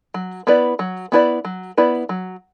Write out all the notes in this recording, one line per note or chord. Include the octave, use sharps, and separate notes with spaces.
F#3
B3 E4 B4 D5
F#3
B3 E4 B4 D5
F#3
B3 E4 B4 D5
F#3